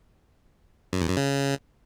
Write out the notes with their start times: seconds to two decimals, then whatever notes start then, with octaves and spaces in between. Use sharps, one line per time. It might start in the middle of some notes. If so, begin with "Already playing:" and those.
0.93 F#2
1.01 E2
1.09 F#2
1.17 C#3